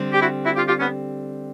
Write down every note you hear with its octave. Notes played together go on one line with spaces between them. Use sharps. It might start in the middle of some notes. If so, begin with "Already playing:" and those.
Already playing: D3 G3 C4
G4
E4 F#4
E4 F#4
F4 G4
F4 G4
B3 C#4